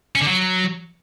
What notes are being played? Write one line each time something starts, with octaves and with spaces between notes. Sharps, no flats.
C#4
D3
F#3